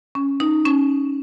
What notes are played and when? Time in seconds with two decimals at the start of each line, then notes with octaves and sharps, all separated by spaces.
0.15 C#4
0.40 D#4
0.65 C#4